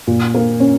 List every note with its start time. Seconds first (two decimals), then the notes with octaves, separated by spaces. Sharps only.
0.07 A#2
0.34 A#3
0.60 C#4